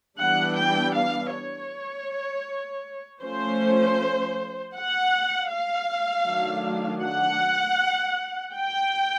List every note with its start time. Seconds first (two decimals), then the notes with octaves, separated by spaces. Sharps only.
0.18 E3 G3 B3 D4 F#5
0.57 G5
0.95 F5
1.32 C#5
3.22 F3 A3 C#4 C5
4.75 F#5
5.50 F5
6.27 D#3 F#3 A3 D4
7.03 F#5
8.54 G5